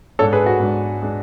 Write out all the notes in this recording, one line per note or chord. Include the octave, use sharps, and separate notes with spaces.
G#2 G#3 D4 A4 C#5
G#4 B4
F#4
G#2 G#3 D4
G#3 D4